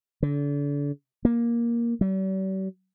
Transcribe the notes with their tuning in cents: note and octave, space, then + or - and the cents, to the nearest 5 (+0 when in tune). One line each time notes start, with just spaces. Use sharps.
D3 -35
A#3 +10
G3 -45